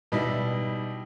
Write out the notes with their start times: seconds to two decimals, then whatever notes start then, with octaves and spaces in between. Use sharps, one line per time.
0.12 B2 G3 D#4 E4